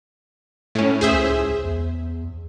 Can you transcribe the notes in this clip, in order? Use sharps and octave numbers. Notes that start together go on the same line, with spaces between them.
A2 C#4
D#2 G#4 C5 E5
C#2
E2